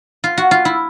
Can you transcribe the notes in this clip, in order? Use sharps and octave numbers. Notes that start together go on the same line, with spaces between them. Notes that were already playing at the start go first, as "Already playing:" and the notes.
F4
F#4
F4
E4